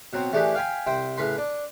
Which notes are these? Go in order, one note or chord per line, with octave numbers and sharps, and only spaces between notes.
B2 F#3 C4
E3 A3 D4 G4 G#4 B4
F5 G5 G#5 B5
C2 C5 E5 G5
A2 C#3 B4 B5 C6
D4